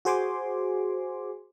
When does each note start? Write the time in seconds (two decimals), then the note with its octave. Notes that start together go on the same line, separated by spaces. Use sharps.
0.05 F#4 G#4 C5 G#5 C6 D6